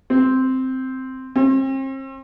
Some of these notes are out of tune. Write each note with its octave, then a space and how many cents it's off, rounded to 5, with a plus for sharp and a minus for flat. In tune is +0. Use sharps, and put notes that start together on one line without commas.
C4 -5
C4 +40